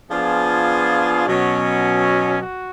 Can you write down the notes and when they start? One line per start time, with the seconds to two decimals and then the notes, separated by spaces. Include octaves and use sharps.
0.11 F3 B3 D4 F4 G#4
1.27 B2 F#3 C#4
2.42 F#4